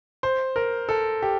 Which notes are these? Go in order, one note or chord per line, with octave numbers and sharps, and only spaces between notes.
C5
A#4
A4
G4